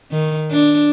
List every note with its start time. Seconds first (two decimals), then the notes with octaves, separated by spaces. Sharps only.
0.11 D#3
0.51 D4